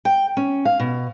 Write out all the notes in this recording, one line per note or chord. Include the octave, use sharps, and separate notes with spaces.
G5
C#4
F5
B2